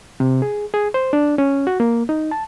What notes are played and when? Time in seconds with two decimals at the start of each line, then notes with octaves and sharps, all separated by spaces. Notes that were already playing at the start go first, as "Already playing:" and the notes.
0.20 C3
0.42 G#4
0.74 G#4
0.94 C5
1.13 D4
1.38 C#4
1.67 F#4
1.80 A#3
2.09 D#4
2.31 A5